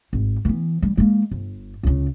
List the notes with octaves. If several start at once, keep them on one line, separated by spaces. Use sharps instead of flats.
G#1
E3 B3
G3
G#3 A#3
G1
C#2 C#3